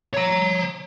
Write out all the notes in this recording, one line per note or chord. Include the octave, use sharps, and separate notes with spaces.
C#5 A#5